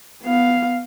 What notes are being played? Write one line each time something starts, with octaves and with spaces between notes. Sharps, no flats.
B3 F5